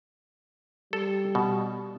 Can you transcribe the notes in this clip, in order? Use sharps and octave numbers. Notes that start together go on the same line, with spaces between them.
G3 A4
B2